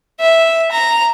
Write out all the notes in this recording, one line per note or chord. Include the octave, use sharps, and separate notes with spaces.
E5
A#5